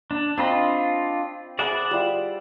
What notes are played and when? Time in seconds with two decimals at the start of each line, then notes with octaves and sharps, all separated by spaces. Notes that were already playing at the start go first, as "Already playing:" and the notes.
0.11 D4
0.38 C4 D4 F4 D#5 B5
1.59 G#4 B4 C5 D5 E5 F#5
1.91 G3 F4